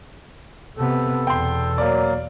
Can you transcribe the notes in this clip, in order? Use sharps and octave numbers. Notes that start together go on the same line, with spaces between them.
C3 B3 A4
E2 B2 G5 C6
F#3 A#3 A#4 D5